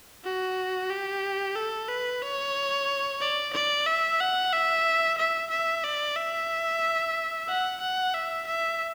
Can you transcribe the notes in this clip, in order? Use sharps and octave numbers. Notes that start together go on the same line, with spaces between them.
F#4
G4
A4
B4
C#5
D5
D5
E5
F#5
E5
E5
E5
D5
E5
F#5
F#5
E5
E5